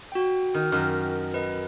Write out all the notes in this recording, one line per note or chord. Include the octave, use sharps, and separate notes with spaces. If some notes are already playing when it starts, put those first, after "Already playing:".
F#4 G5
D#3
F#2 D#3
B4 D#5